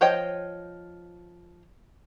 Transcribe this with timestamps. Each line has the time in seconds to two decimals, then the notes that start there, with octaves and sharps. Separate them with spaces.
0.01 F3 C5 C#5 D#5 G5